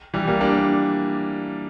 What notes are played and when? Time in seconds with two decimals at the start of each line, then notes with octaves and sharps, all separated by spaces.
0.14 E3 G3
0.27 G3 A#3
0.41 A#3 D4